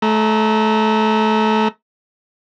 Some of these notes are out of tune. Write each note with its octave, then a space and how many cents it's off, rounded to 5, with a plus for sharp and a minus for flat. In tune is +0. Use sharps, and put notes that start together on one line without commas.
A3 -25 A#5 +0